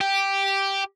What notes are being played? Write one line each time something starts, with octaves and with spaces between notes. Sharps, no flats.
G4